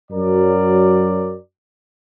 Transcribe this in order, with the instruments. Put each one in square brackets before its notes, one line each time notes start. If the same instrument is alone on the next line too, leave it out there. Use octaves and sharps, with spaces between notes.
[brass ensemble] F#2 F#3 A#4 D5